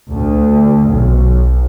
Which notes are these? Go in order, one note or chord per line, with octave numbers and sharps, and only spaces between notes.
D2
B1